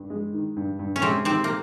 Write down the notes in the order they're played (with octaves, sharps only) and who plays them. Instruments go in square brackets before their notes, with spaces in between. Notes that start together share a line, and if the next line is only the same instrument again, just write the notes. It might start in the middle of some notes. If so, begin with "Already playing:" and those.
Already playing: [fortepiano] G2
G#3
D#3
G2
G2
[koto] C#4
[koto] C3 C4 [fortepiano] G#3
[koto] C3 C4 [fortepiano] D#3
[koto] A#3